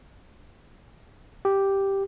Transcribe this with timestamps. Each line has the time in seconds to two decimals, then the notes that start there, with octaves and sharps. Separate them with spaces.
1.45 G4